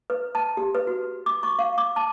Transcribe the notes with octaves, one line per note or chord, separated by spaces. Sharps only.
B4
A5
G4
B4
F#4
D6
C#6
F5
D6
A5